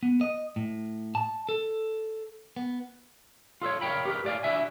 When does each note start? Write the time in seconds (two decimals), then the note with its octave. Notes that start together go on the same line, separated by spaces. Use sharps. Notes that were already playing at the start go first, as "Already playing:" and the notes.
0.03 B3
0.21 D#5
0.56 A2
1.15 A5
1.49 A4
2.56 B3
3.62 F4 A4 B4 C#5
3.81 A#4 C#5 F5 G5 B5
4.05 G4 A#4 B4
4.25 A2 D5 F5 G#5
4.43 D4 E4 F#4 E5 G#5